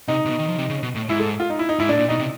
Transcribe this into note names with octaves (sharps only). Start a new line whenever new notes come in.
C3 D#4
C3
B2
D#3
F3
C3
C#3
B2
A2
G#2 E4
A4
F4
D#4
E4
D#4
G#2 E4
A2 D4
A#2
B2 D#4
C3